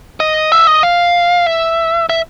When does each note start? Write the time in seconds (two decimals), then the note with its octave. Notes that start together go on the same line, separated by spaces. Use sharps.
0.20 D#5
0.52 E5
0.67 D#5
0.83 F5
1.46 E5
2.09 E5